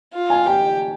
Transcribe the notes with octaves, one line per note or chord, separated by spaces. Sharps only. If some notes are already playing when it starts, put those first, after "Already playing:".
F4
G#5
G4 G5